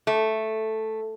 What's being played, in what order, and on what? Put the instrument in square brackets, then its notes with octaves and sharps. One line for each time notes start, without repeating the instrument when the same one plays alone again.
[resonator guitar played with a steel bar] A3